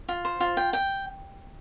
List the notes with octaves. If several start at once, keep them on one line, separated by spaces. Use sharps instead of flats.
F4
C5
F4
G5
G5